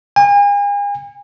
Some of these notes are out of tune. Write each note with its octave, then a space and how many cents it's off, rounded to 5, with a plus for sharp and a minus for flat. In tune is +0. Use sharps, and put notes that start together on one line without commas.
G#5 -40